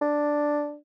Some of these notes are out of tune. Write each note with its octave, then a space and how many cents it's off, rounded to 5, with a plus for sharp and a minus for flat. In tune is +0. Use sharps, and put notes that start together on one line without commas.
D4 +0